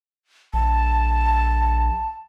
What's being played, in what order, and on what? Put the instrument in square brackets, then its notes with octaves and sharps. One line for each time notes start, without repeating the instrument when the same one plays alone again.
[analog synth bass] A#1 [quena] A5